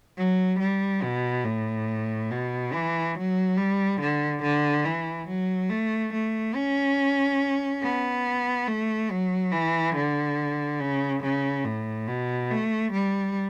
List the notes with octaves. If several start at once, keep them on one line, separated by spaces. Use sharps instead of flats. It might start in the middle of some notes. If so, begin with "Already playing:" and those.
F#3
G3
B2
A2
B2
E3
F#3
G3
D3
D3
E3
F#3
A3
A3
C#4
B3
A3
F#3
E3
D3
C#3
C#3
A2
B2
A3
G3